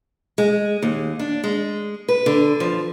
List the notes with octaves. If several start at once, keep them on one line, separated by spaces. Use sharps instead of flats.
G#3
D#2
D4
G#3
B4
D3
F3